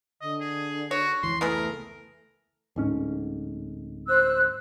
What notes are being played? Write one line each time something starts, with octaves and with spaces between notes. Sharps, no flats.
D3 D#5
G#4
F#4 C#5
F1 C#2 E3 C6
A3 B3 E4 G#4 A#4
D1 G#2 C#4
C5 E6 F#6